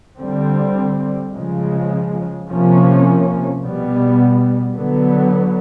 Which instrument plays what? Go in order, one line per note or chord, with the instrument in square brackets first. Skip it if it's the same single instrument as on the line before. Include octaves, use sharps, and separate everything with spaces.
[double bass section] D3 G3 C4
C#3 F3 G#3
C3 F3 A#3 C#4
B2 G3 B3
D3 F#3 B3